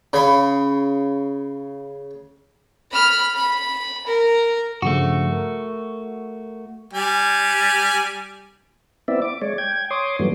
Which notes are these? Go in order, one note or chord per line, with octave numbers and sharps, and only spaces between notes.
C#3 B5
B5 F6
B5
A#4
G2 C#3 F3 A3 F#4
A#4
G3 G#5
B3 C4 E4 D5 E5
D6
G#3 C#5 D5
G5 G#6
C#5 C6 D6 D#6
G2 E3 F#3 G3 A3 B3